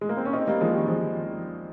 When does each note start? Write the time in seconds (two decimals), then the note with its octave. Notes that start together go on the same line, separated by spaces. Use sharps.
0.01 G#3
0.09 A#3
0.17 C4
0.25 C#4
0.33 C4 D#4
0.47 G3 A#3
0.61 F3 G#3
0.75 D#3 G3
0.88 F3 G#3